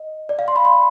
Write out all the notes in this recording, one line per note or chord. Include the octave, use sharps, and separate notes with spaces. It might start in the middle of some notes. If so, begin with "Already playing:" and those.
Already playing: D#5
D5
F5
C6
B5
C6